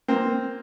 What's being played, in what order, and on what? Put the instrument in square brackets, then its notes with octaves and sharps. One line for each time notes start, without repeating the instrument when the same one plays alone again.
[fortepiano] A#3 C4